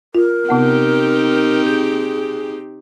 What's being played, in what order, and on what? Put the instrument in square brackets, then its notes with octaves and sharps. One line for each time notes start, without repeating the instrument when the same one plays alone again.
[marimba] F4 [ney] A#4
[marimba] C3 B3 F#5 [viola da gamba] C4 D#4 G4
[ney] G#4 [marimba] G6